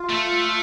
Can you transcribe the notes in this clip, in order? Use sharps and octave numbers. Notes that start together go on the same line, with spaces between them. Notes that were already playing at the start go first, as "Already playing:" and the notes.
Already playing: F4
A3